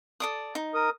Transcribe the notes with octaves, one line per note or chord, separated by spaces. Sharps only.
A4 D5 D#6
D#4
A#4 D#6